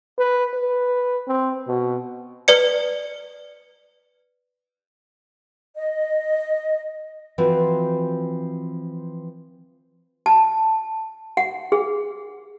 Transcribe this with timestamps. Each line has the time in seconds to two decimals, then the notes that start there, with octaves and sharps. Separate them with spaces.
0.18 B4
0.54 B4
1.27 C4
1.67 B2
2.48 B4 D5 C#7
5.75 D#5
7.38 E3 F3 C4 F4 F#4
10.26 A5
11.37 F#5
11.72 G#4